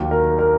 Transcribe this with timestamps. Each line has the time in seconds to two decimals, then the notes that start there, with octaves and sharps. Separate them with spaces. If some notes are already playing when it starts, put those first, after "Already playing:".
Already playing: D#2 D#3 F#3
0.11 A#4
0.39 A#4